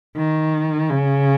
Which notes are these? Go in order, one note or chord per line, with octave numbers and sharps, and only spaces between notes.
D#3
C#3